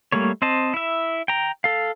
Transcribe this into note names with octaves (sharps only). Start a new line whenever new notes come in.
G3 A3 A#3 C#5
C4 C5 D#5 A5
E4 E5
G5 A#5
A4 F5